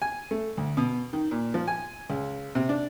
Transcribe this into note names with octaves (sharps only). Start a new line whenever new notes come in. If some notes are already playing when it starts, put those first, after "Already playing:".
G#5
A3
D2
B2
D#3
A#2
F3
G#5
C#2
C3
D4